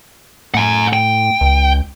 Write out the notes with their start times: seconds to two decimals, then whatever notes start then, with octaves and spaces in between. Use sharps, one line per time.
0.54 A2 F#5 G#5
0.93 G5
1.41 C#2